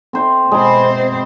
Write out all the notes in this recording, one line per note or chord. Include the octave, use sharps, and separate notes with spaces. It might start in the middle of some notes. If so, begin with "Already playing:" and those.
C4 C5 E5
B2 G#3 C4 C5 B5